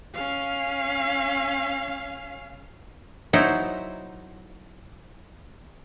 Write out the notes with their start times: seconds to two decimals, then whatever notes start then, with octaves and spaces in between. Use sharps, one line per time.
0.15 C#4 F5
3.33 F#3 B3 D#4 E4 C5 F#5